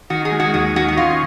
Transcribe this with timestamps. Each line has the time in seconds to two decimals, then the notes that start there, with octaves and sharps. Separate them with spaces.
0.10 D#3 F#4
0.25 G#4
0.32 G#3
0.40 F#4
0.54 D#2 F#4
0.76 D#3 F#4
0.88 F#4
0.97 C#4 F4